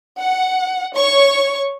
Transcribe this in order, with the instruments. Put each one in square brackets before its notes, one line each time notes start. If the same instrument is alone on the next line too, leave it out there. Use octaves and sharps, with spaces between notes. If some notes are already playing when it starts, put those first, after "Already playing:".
[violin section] F#5
C#5 C#6